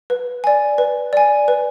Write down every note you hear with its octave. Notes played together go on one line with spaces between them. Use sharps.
B4
D5 G#5
B4
D5 G#5
B4